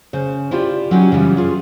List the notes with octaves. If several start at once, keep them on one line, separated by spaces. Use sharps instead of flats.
C#3 C5
E4 F4 G4 C#5 D5
F#3 C#4 D#4 F#4 G4
C#3 E3 G3 F4
F4 G#4 C#5